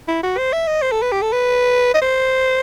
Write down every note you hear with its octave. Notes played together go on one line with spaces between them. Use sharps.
E4
F#4
C5
E5
D#5
C5
A4
B4
G4
A4
B4
D#5
C5